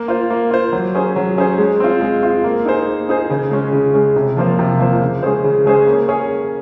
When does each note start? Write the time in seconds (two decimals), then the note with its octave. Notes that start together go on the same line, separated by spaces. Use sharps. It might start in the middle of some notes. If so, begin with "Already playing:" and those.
Already playing: A#3
0.08 F4 C5
0.30 A#3
0.51 F4 C5
0.72 F#3
0.95 C#4 G#4 C5
1.16 F#3
1.38 C#4 G#4 C5
1.58 G#3
1.80 C4 F4
2.01 G#3
2.23 C4 F4
2.44 A#3
2.65 D#4 G#4 C5
2.87 A#3
3.09 D#4 G#4 C5
3.30 C#3
3.51 G#3 C#4
3.73 C#3
3.94 G#3 C#4
4.16 C3
4.37 F3 A#3 F4 C5
4.59 C3
4.80 F3 A#3 F4 C5
5.01 C#3
5.23 G#3 C#4 G#4 C5
5.44 C#3
5.66 G#3 C#4 G#4 C5
5.86 A#3
6.08 C#4 G#4 C#5